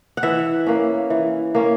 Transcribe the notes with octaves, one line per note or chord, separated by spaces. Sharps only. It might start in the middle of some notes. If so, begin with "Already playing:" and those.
F#5
E3 E5
A#3 C#4
E3
A#3 C#4